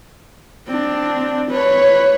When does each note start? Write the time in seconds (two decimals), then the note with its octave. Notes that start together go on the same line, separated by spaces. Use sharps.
0.67 C4 D4
1.52 B4 C#5